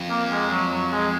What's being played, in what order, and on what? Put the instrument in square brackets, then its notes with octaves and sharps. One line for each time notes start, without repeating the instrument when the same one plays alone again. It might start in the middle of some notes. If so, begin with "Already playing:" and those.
Already playing: [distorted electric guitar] F2
[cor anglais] A#3
G#3
F#3
F#3
G#3